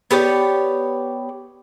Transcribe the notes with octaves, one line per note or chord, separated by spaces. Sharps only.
B3 G4 C#5 D5